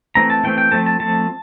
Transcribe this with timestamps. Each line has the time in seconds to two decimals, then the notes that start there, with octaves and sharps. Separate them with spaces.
0.15 E3 A3 C4 A#5
0.30 A5
0.44 E3 A3 C4 G5
0.58 G5
0.72 F3 A3 C4 A5
0.86 A5
1.00 F3 A3 C4 A5